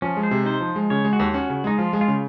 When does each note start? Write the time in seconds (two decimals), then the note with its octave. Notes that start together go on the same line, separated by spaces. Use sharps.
0.02 F3 C#4
0.17 G#3
0.23 C5
0.31 C3
0.45 D#4 C5
0.61 F3
0.76 G#3
0.90 C#3 C#5
1.05 G#3
1.13 F#4
1.19 D#2
1.34 C#4 F#4
1.50 C#3
1.64 G#3 D#4
1.78 F3 F4
1.93 G#3
2.01 F4
2.08 C#3